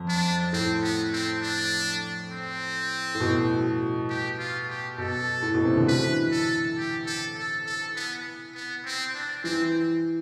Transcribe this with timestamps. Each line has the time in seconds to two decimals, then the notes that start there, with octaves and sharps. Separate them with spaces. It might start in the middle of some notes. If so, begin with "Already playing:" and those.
Already playing: F2
0.08 D4
0.53 A2 C4
0.82 B3
1.12 C4
1.42 D4
2.31 C4
3.15 A2
3.20 B2
4.10 G4
4.39 F4
4.69 G4
4.98 B2 A4
5.42 A2
5.54 B2
5.65 C3
5.76 D3
5.87 E3 B4
6.32 A4
6.77 G4
7.06 A4
7.36 A4
7.66 A4
7.96 B3
8.55 B3
8.85 C4
9.14 D4
9.44 E3 C4